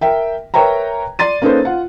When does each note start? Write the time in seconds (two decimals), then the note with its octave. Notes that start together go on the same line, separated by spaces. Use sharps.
0.01 A#4 E5 G5
0.54 A#4 B4 C#5 E5 G5 A#5
1.19 D5 C6 A6 D#7
1.42 A#3 C#4 D#4 A4 B4 C5
1.65 F4 F#5